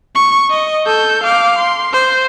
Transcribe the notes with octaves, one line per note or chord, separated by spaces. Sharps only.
C#6
D#5
A4 G6
F5 D6
C6
C5